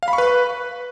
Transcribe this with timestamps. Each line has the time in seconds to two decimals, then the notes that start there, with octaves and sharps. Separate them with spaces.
0.03 F5
0.08 B5
0.13 C#6
0.18 B4